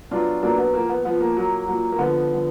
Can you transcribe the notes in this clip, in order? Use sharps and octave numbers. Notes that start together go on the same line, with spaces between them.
B2 F#3 D4 F4
B2 F#3 A#3 D4
B3
A#2 F3 A#3
B3
A#2 F3 B3
A#3
A#2 F#3
A#2 F#3
A#3
D3 F3 B3
D3 F3